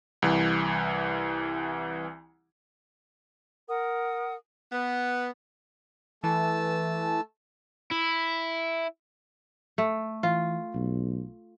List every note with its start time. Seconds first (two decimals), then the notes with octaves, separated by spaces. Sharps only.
0.22 C2 E3
3.68 A#4 F#5 D#6
4.72 B3
6.23 E3 A3 A5 E6
7.91 E4
9.78 A3
10.23 E3 F4
10.74 B1